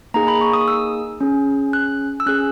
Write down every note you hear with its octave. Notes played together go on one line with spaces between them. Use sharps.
A#3 D#4 G#4 A#5
B5
C#6
D#6
E6
C#4 G#4
F#6
E6
C#4 G#4 F#6